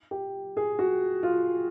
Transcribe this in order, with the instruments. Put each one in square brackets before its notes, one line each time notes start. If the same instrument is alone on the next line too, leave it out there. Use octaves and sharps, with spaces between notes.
[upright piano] G4
G#4
F#4
F4